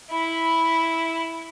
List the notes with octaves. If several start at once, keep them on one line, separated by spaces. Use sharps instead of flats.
E4 B5